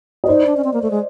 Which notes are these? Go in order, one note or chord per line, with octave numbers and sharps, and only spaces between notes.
D#5
D#4 C5 D5
D4
C#4
C4
A#3
A3
G#3